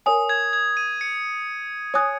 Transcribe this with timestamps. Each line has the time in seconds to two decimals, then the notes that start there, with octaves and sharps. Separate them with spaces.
0.06 A#4 C#5 G#5 D#6
0.29 G#6
0.53 G#6
0.77 D#7
1.01 C#7
1.94 C#5 G#5 D#6 F#6